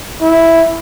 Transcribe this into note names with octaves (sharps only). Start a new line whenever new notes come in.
E4